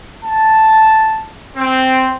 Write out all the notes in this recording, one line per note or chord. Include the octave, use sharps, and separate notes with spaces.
A5
C4